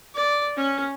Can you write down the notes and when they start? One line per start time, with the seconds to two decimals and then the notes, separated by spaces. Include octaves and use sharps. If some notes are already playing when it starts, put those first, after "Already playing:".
0.14 D5
0.57 C#4